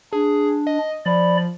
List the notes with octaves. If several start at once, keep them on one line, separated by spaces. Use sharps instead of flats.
D4 G#4
D#5
F3 D5 B5